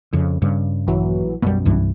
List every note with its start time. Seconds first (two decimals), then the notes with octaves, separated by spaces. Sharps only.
0.13 F2 C#3
0.42 G2 C#3
0.87 A#1 E3 F#3
1.42 B1 F#2 B2 G3 A#3
1.65 C2 G2 E3